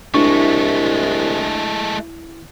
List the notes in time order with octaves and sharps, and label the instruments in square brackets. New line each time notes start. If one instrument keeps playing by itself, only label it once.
[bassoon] C2 [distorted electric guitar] G#3 A3 [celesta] D4 [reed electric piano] E4 C#6